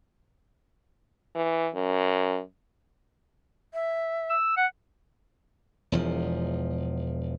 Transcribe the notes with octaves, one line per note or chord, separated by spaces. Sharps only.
E3
F#2
E5
E6
F#5
E1 E2 F3